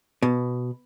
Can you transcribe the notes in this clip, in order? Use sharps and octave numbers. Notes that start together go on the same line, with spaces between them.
B2